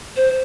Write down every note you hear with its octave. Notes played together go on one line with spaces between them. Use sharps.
C5